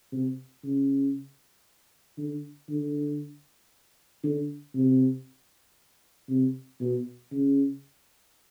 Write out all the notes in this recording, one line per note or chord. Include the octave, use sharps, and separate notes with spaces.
C3
C#3
D3
D3
D3
C3
C3
B2
C#3